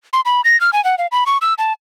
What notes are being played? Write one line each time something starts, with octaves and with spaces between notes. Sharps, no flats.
C6
B5
A#6
F6
G#5
F#5
F5
B5
C#6
E6
A5